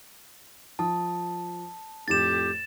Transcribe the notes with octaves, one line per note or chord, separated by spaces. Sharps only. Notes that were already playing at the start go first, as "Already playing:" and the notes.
F3 A5 D#6
F2 A2 G4 A6 E7